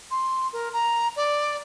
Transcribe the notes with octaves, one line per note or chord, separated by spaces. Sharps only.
C6
A#4
A#5
D5